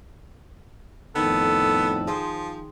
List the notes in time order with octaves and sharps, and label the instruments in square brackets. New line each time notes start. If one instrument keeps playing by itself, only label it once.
[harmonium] F2 A2 [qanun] D#3 D#4 [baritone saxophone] B3 [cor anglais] A4
[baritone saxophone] F3 [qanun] G#4 C5 G5